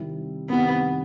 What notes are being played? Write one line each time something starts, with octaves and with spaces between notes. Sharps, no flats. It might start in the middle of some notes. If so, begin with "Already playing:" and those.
Already playing: C3 D#3 G3 C4 E4
C3 D#3 G3 B3 C4 E4